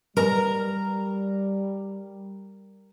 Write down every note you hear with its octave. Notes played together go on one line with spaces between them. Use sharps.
G3 A#4 A#5